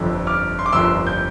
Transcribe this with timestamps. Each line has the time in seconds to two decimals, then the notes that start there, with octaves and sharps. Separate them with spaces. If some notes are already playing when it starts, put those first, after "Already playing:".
Already playing: G1 F2 D3
0.27 D6 F6
0.59 C6
0.66 D6
0.72 G1 F2 D3 C6 E6
1.07 G6